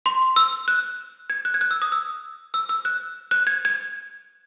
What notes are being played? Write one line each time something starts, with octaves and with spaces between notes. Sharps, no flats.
C6
E6
F#6
G#6
F#6
G#6
F#6
E6
D#6
E6
E6
E6
F#6
F#6
G#6
G#6